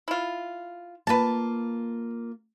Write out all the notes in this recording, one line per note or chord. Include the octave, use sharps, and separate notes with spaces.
E4 F4
A#3 F4 B4 A5